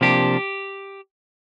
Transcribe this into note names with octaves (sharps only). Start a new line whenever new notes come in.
C3 F3 A#3 D4 G4